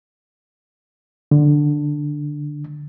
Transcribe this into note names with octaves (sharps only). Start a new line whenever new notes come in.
D3